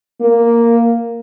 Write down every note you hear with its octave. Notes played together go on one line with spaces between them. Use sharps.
A#3